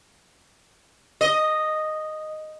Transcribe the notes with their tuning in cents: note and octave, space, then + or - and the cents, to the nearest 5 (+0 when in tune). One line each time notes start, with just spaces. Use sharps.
D#5 -5